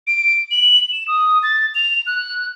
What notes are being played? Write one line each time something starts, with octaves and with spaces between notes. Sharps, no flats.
D7
F#7
E7
D#6
A6
F7
F#6